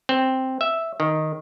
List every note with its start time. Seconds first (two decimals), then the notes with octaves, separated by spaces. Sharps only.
0.09 C4
0.61 E5
1.00 D#3